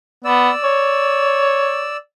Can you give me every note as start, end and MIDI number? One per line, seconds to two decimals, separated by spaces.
0.24 0.50 59
0.24 1.97 74
0.24 1.97 88
0.64 1.89 73